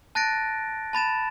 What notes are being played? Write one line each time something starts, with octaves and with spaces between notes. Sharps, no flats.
A5 F#6 A6 A#6 D7
A5 B5 A6 E7